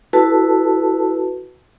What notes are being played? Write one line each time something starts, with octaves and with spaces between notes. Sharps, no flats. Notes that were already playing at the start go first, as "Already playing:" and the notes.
E4 F#4 A4 B4 A5